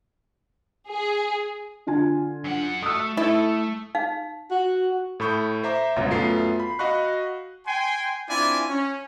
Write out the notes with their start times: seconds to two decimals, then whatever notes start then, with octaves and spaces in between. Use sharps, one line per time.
0.87 G#4
1.87 D3 F4 G#5
2.45 F#2 F#5
2.83 A3 D#6 E6
3.17 A3 E4 A4
3.95 D#4 F5
4.51 F#4
5.20 A2 A4 B5 C#6 G6
5.63 C5 E5 A#5 D6
5.96 G1 C#2 B2 F4 C#5 A#5
6.10 F#2 A3 B3 F4 C7
6.60 B5
6.79 F#4 D#5 F5 B5 C#6 F#6
7.67 G5 G#5 C6
8.29 C4 D4 E4 F4 D5 G#5
8.69 C#4